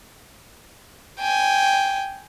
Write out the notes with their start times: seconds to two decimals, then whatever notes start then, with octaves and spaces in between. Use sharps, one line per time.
1.20 G5 G#5